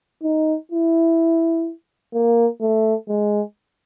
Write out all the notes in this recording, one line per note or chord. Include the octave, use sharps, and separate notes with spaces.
D#4
E4
A#3
A3
G#3